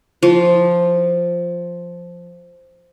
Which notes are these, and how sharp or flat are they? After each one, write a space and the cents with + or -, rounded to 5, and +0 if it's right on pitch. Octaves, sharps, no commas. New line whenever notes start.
F3 +0